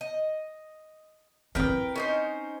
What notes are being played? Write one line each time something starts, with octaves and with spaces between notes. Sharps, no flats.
D#5
C4 E4 A#4 B4 G5
C#4 D#4 C5